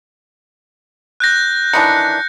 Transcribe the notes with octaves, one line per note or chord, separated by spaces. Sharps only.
F#6 G6 A#6
D#3 E3 D4 C#7